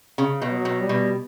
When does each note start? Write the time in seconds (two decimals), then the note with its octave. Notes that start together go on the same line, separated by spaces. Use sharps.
0.18 C#3
0.42 B2
0.50 F#3
0.65 B2
0.81 G3
0.89 B2